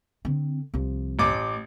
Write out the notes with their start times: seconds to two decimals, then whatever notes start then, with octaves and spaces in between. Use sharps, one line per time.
0.25 D3 C4
0.74 C2 F3
1.19 A1 D6